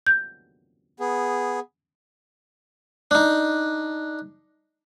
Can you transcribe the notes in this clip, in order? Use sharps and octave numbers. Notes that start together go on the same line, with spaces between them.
G6
B3 G#4
D4 D#4